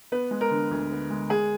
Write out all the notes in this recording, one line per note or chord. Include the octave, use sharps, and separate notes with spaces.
B3 B4
G#3
A#4
D3
D2
B3
G#3
G#3 G#4